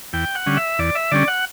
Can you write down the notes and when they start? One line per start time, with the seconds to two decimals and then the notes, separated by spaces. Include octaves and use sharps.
0.13 E2 G5
0.35 F#5
0.46 D3 G3 C#4
0.57 E5
0.79 E2 D5
0.95 E5
1.11 D3 G3 C#4 D5
1.28 F#5